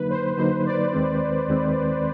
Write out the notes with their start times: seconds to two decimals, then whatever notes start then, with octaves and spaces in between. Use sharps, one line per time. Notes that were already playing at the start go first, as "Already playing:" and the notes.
Already playing: D3 F#3 A#3 D#4 B4
0.10 C5
0.38 D3 F#3 A#3 D#4 C5
0.66 D5
0.93 D#2 D#3 G#3 C4
1.48 D#2 D#3 G#3 C4